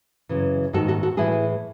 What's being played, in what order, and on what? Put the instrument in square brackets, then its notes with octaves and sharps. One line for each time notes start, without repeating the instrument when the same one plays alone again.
[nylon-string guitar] F#2 C#3 E3
G#2 D#3 F#4 A4
F#4 A4
F#4 A4
A2 E3 E4 G#4